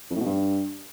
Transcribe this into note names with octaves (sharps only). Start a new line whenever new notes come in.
F2
A2
B2
G2